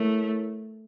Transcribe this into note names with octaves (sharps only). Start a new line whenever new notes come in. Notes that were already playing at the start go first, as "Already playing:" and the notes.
Already playing: A3 E4 A#4 C#5